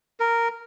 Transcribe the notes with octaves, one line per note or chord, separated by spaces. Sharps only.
A#4